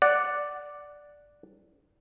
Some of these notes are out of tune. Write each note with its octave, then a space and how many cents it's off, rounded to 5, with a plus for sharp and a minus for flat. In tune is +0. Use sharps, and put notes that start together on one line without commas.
D5 +0 F#5 +0